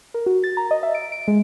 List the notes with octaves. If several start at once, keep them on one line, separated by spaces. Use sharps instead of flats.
A#4
F#4
A6
A#5
D#5
E5
D7
D7
G#3